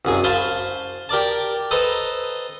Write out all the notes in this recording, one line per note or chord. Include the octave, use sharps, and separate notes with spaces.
C2 F#2 G#4
C5 F5 G#5 A5 B5 C6
G4 A#4 D5 A5
A4 B4 C5 D#5 A#5